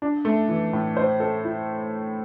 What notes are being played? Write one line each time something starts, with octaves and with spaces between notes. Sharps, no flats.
D4
A3
E3
A2
C5
A4
E4